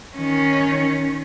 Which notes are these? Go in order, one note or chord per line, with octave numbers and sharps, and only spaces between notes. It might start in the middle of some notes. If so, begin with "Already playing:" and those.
D#3 C#4